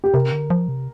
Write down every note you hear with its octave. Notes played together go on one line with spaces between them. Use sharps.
G4
C3 A#4
D3
F3
C3